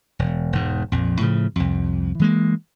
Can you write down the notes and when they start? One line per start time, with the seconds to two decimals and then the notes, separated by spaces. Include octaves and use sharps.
0.19 E1
0.53 E1 G#2
0.92 A#1 F2
1.21 A2 C#3 F3
1.56 C2 F2
2.19 E3 G#3 A#3